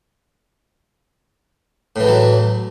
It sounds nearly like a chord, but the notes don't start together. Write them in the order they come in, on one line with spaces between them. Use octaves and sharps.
A2 E3 E2 F#3